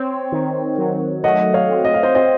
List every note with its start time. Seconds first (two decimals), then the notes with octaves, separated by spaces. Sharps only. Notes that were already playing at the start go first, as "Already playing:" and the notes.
Already playing: C4 C#5
0.32 D#3
0.78 F#3
1.24 A3 D#5 F#5
1.54 C#5 F5
1.69 C4
1.85 D#5
1.94 F5
2.03 C5 D#5
2.15 C4 C5 D#5